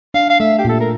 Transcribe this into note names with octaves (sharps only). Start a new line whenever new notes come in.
D4 F5
F5
A3 E5
G4
A#2 A4
A#4